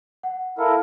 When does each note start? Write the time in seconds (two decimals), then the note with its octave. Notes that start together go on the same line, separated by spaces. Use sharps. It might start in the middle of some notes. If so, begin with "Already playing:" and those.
0.23 F#5
0.58 E4 A4 A#4 F5